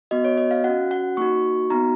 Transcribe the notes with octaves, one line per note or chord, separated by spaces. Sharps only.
B3 F#4 D#5
C#5
D#5
F5
C#4 F#4 F#5
F#5
A#3 D#4 F#4 C#6
B3 D#4 F#4 A#5